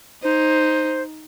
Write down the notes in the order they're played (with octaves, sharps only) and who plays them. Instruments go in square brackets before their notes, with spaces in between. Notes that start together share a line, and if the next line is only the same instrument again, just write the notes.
[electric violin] D#4 [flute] C5